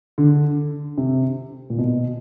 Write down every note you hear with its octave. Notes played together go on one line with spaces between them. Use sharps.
D3
C3
A#2
B2